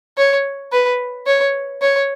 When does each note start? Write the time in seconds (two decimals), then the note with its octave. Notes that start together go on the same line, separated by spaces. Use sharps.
0.18 C#5
0.72 B4
1.27 C#5
1.82 C#5